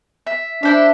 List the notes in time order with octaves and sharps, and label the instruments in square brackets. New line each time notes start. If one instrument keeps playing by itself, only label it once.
[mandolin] E5
[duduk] D4 [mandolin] E4 C5 E5